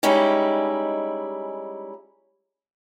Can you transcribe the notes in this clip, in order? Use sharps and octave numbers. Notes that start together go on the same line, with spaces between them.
G3 G#3 C#4 D#4 E4 G4